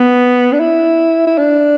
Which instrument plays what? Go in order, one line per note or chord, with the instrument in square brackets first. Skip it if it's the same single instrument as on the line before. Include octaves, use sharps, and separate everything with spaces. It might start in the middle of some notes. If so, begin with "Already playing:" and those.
Already playing: [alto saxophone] B3
D4
E4
E4
D4